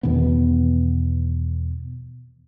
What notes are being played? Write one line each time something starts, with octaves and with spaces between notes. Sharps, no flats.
E2 B2 D#3 B3